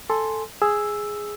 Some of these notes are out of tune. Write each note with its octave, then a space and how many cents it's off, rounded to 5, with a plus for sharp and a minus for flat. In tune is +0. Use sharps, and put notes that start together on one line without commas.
A4 +0 G#5 +0 C6 +0
G#4 +0 E6 +0